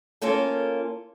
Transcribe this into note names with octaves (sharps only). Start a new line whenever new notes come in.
A#3 C#4 F4 A4 A#4